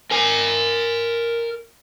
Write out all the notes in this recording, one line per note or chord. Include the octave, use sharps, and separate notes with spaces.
A#4 G#5